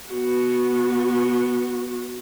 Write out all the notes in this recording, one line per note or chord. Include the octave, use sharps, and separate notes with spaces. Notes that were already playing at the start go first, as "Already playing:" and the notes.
B3 F#4